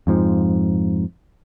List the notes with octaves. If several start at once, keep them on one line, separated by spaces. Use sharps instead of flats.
F2 G#2 F3